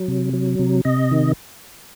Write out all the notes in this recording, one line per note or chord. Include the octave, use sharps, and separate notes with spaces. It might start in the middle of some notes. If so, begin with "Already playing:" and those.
Already playing: F#3
C3
F#3
C3
C3 D#5
D#3